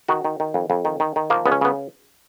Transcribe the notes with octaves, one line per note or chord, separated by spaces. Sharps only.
D#3 F#4
D#3
D#3
F2
F2
D#3
D#3
D#3
F3 A#3
C#2 B3
C#4
C#3 B3